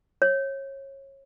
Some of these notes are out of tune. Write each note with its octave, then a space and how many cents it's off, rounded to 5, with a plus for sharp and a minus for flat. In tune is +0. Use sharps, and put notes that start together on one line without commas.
C#5 -25